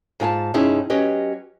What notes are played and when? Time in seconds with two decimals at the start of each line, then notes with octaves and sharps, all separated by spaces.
0.20 G#2 F4 G#5 A5
0.54 G2 C3 C#4 D#4 E4 G#4
0.90 F#3 C#4 G4 B4 D#5